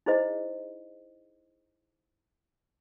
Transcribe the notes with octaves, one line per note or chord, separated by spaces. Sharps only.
D#4 E4 G#4 C5 D#5